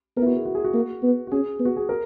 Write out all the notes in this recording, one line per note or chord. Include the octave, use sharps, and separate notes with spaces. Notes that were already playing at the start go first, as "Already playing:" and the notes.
B3 A#4
E4
F#4
G#4
F#4
G#4
F#4
A#3
B3
F#4
C#4 G#4
B3
F#4
G#4
A#4